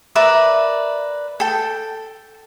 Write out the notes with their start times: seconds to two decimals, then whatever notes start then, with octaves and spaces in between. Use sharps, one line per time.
0.15 A#4 B4 D5 E5
1.40 A4 G5